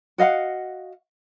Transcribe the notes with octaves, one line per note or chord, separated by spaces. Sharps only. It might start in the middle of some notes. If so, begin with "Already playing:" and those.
F#4 D#5 F5 F#5